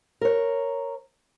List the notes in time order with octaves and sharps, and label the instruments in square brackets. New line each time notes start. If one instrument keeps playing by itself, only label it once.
[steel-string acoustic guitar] A#4 C#5